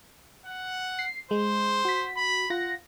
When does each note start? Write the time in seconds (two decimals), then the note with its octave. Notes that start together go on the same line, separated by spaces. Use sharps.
0.46 F#5
0.99 C7
1.31 G#3 C5
1.85 F#4 B6
2.17 B5
2.50 F4 F#5 A#6